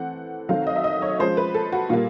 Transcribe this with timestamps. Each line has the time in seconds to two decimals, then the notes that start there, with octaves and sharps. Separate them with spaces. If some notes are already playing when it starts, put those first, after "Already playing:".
Already playing: E3 A3 C4 F#5
0.49 D#3 F#3 A3 C4 F5
0.67 D#5
0.76 E5
0.84 D#5
1.02 C#5
1.19 F3 G#3 C#4 C5
1.37 B4
1.54 A4
1.72 F#4
1.89 A#2 G3 A#3 F4